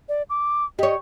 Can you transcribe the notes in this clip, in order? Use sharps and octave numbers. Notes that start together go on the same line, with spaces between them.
D5
D6
G4 C#5 D#5